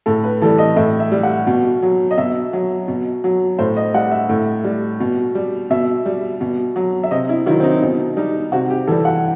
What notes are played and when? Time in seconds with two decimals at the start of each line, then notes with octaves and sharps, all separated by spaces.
0.06 A2 A4
0.24 B4
0.42 E3 A4
0.44 G3
0.59 D#5
0.76 A2 E5
1.00 E5
1.12 G3
1.23 F#5
1.47 B2
1.82 F#3
2.11 D#5
2.17 B2 E5
2.53 F#3
2.88 B2
3.24 F#3
3.59 A2 C5
3.77 D#5
3.94 G3 F#5
4.12 E5
4.29 A2
4.64 G3
5.00 B2
5.35 G3
5.70 B2 E5
6.06 G3
6.41 B2
6.76 F#3
7.03 E5
7.11 C3 D#5
7.29 E4
7.46 D#3 F#3 E4
7.60 C4
7.64 D#4
7.82 B2 D#4
8.17 G3 D#4
8.52 C3 F#4
8.70 G4
8.87 E3 G3 A4
9.05 F#5